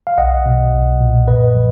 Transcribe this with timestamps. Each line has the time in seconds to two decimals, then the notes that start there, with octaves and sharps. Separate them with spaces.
0.07 F5
0.18 B1 D#5 F#5
0.46 B2
0.73 B1
1.01 A#2
1.28 F#2 B4 D#5
1.55 F3